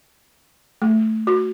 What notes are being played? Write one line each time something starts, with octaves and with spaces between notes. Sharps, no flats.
A3
F#4